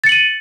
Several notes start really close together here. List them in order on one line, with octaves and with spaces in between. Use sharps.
A6 C#7 F#7 D#7